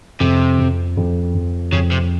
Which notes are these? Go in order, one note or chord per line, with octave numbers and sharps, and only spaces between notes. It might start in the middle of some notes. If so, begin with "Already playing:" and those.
F2 C3
F2
F2
F2
F2 C#3
C3